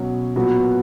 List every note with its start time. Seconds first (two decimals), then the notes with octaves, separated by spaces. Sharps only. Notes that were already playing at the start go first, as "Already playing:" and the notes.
Already playing: B2 F#3 C#4 F#4
0.36 A#2 F#3 B3 F#4